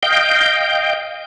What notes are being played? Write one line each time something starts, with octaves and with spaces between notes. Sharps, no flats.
D#5 F5 G5 G6